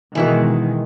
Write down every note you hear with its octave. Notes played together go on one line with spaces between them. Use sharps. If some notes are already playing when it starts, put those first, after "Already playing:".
B2 D#3 E3 G#3 E4 F#4